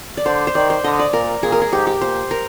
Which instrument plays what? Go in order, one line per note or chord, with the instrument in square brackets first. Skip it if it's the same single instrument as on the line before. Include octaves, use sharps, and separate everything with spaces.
[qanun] D5
[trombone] D3 [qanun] C5
[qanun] C5
[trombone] D#3 [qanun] D5
[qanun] C5
[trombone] D3 [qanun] D#5
[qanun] D5
[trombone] A#2 [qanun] A#4
[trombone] A#2 [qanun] G#4
[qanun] A#4
G#4
[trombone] G#2 [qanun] G4
[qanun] G4
[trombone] A#2 [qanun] C5
[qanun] A#4